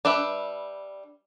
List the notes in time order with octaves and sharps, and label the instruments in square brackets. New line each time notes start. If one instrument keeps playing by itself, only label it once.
[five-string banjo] G3 D4 B4 E5